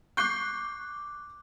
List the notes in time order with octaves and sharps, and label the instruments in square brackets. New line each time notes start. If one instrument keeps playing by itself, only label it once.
[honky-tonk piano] C#6 G6 C7 [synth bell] D6 F#6